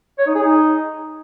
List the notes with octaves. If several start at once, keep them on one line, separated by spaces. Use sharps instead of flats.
C#5
D#4
G#4
D#4